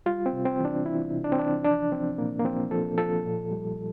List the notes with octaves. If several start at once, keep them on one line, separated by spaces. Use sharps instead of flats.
G3 F4
C4
C3
C4
E3
D4
E3 E4
C3
D4
C4
E3 D4
F3 D4
F3 C4
A#2 A#3
A#3
F3 C4
F3 A4
F3 A4
A#2
G3